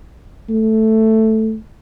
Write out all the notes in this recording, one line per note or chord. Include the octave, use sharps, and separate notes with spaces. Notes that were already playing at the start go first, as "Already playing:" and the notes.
A3